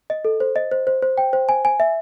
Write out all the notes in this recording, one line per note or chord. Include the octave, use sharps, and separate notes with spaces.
D#5
A4
C5
D#5
C5
C5
C5
G5
C5
G#5
G#5
E5